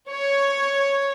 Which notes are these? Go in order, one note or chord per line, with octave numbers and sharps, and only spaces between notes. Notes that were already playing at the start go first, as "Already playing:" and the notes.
C#5